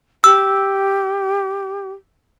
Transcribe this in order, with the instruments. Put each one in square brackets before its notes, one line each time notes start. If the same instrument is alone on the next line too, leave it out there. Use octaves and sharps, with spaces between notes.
[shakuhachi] G4 [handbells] E6